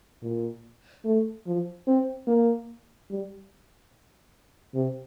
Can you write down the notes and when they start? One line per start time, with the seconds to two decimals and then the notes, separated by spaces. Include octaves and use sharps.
0.23 A#2
1.05 A3
1.46 F3
1.87 C4
2.27 A#3
3.10 G3
4.74 C3